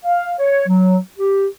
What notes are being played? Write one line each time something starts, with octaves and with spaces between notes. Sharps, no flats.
F5
C#5
F#3
G4